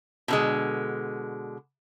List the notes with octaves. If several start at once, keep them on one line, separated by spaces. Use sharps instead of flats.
B2 D3 G#3